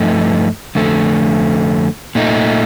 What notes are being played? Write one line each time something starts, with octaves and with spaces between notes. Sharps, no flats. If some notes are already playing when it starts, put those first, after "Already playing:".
Already playing: G2 F3 A3 D#4
F2 D3 A3
A#2 A3 D#4